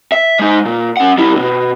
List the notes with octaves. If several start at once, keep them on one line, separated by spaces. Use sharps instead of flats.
E5
G#3 D#4
A#2
C#4 F#5
G3 E4
C#2 B2